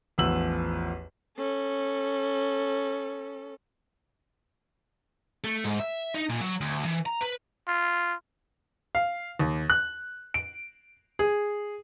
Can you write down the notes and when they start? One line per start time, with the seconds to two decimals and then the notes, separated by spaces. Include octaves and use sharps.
0.18 A1 E2 F3 E6 F#7
1.37 C#4 A4
5.44 A3
5.64 G#2
5.80 E5
6.15 D#4
6.29 A#2
6.41 F#3
6.61 D2
6.85 E3
7.06 A#5
7.21 B4
7.67 F4
8.95 F5
9.39 D#2
9.70 F#6
10.34 D7
11.19 G#4